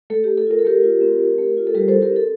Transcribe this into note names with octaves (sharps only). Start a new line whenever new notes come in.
A3 A4
A3 G4
A4
F4 A#4
A4
A3 G4 A#4
F4
C4
A3
A3
F4
A4
G3 G4 A#4
E4 A4 C5
G4 A#4
C4 A4